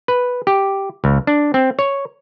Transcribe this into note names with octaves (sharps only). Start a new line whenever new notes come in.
B4
G4
C#2
D4
C4
C#5